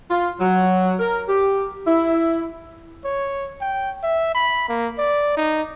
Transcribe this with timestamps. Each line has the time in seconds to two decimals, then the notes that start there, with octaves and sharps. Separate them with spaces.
0.10 F4
0.40 F#3
0.99 A#4
1.28 G4
1.86 E4
3.04 C#5
3.61 G5
4.03 E5
4.35 B5
4.69 A#3
4.98 D5
5.37 D#4